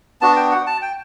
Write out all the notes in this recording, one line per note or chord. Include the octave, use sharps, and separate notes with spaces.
B3 D4 F#4 A5
G5
F#5
A5
G5